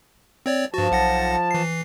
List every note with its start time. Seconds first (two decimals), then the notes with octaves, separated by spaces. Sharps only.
0.46 C4 C#5 D5
0.74 G2 F3 F#4 A5
0.91 B1 F#5 A#6
1.51 E3 C7